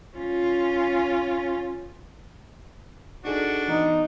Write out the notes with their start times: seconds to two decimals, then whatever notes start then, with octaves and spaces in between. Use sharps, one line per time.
0.17 C#4 F4
3.25 D4 D#4 F#4 G#4 A4
3.68 E3 B3 D#4